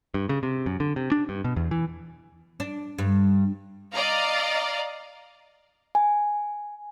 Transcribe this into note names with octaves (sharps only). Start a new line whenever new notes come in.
G2
C#3
C3
F#2
D3
C3
D4
G2
B2
E2
E3
D4
G2
D5 D#5 F5 A#5
G#5